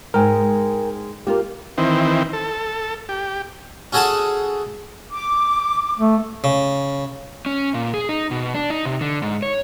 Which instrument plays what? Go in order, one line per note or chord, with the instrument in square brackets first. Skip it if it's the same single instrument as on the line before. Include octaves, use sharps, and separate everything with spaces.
[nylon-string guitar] G#2 G#3 [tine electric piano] A#4 G5 G#5
[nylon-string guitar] A#3 F4 [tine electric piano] G4 A#4
[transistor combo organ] D#3 E3 C4
A4
G4
[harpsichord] C#4 F#4 G#4 A4 F#5 A5
[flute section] D6
[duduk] A3
[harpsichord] C#3
[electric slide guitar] C#4
A#2
G#4
D#4
B2
D4
D#4
C3
D3
G#2
C#5